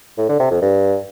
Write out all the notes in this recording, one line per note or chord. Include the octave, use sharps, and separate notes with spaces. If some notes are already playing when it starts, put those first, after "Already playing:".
A2
D3
C3
F2
G2